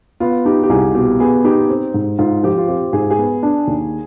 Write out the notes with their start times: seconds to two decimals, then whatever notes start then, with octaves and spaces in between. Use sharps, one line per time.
0.20 B3 F4
0.45 D#4 G4
0.63 G4
0.70 C2 G#4
0.94 B2 G4
1.20 B3 G#4
1.45 D#4 G4
1.69 C4
1.94 G#2
2.18 G#2 F4
2.43 F3 G4
2.57 F4
2.68 C4 G4
2.93 G#2 G#4
3.10 G#4
3.18 B3
3.43 D4
3.67 D#2